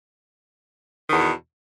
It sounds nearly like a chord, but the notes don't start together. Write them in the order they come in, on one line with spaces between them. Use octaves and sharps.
D#3 E2 B2